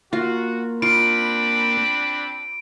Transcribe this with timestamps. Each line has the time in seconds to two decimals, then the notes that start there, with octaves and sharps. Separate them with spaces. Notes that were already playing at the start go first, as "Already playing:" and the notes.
0.13 A#3 F4 F#4
0.82 C4 D4 F4 B5 D7